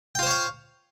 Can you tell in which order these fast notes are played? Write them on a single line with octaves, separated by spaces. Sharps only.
G5 F4 C5 C#5 F5